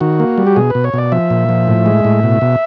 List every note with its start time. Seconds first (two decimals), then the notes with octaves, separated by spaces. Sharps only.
0.01 D#3 F#4
0.20 A#3
0.38 G3
0.47 G4
0.56 B2 G#4
0.70 B2 B4
0.84 C#5
0.94 B2 D5
1.12 F3 E5
1.30 A#2
1.49 F3
1.68 A2
1.86 G#3
2.05 A2
2.23 B2
2.41 B2